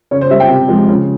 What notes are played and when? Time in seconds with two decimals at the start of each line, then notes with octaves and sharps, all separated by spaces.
0.11 C#3 C#5
0.21 C5
0.30 G3 E5
0.40 G5
0.49 C3
0.68 F3 G#3
0.88 C#3